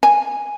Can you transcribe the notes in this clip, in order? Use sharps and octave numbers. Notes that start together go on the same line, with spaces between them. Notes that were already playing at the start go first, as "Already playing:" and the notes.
G#5